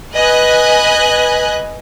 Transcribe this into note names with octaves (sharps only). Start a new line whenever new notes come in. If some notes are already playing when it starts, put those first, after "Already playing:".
B4 D#5 G#5 F#6